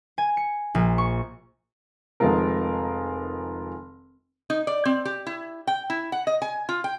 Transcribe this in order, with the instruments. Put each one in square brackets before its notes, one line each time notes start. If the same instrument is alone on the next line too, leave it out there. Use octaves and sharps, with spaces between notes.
[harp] G#5
C#7
A#1
C#6
[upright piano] F1 D#3 F3 G#3 F4 A#4
[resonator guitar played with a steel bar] D#4
D5
C4
G4
E4
G5
E4
F#5
D#5
G#5
F4
G5